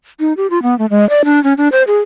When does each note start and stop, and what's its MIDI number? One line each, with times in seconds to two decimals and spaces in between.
0.20 0.33 63
0.37 0.47 67
0.50 0.62 65
0.63 0.77 59
0.79 0.86 57
0.90 1.08 56
1.09 1.22 74
1.25 1.42 62
1.44 1.53 61
1.58 1.68 62
1.72 1.83 72
1.87 1.98 68